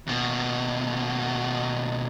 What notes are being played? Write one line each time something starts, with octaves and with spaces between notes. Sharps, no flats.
D#2 B2